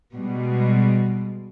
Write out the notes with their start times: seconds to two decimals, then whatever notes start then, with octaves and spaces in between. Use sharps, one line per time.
0.14 B2 G3 G#3